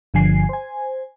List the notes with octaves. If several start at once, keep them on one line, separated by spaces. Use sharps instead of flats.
G1 G2 D3 F3 G#5 C7
C5 G#5